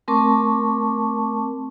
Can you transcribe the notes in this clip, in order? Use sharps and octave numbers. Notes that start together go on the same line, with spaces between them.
A3 C4 A#4 A5 C#6 D6